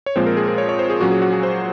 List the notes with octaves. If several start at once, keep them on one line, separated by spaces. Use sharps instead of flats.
C#5
A#2 F3 G#3 C4 C5
A#4
G#4
A#4
C#5
C#5
C5
G#4
A#2 F#3 C#4 F#4
G#4
F#4
G#4
C5